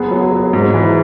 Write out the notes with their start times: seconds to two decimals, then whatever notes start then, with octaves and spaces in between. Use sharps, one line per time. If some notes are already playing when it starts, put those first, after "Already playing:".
Already playing: F#1 B3 G#4
0.11 F#3
0.32 F#3
0.53 G#2
0.74 E3